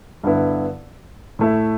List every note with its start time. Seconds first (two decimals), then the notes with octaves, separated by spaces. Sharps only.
0.24 G2 D3 B3 E4
1.39 A2 A3 E4